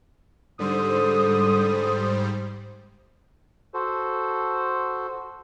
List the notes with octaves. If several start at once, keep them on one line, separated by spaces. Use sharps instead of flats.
G#2 D3 G3 C5 D#6
F#4 A4 C5